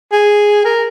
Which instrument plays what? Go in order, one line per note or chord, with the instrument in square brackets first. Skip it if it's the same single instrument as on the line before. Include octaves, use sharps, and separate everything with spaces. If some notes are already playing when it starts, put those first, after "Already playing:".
[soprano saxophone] G#4
A#4